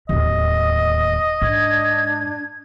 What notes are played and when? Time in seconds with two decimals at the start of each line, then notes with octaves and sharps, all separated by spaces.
0.09 D1 D#2 D#5
1.42 G#2 D4 G#6